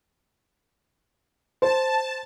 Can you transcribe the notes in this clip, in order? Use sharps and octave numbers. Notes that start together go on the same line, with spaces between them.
C5 A5